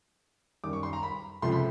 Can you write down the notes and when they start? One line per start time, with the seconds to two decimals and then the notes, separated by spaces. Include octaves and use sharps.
0.64 F#2 D#3 G3 D6
0.73 C#6
0.83 C6
0.93 A#5
1.03 B5
1.42 C#2 C3 F3 A3 C6
1.52 B5